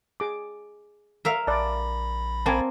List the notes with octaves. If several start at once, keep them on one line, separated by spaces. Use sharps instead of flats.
G#4 D6
A#4 E5 F5
A#1 D5 A5 B5
A#3 C4 G#5 A5